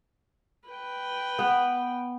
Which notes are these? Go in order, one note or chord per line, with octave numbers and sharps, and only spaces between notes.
B4 G5
B3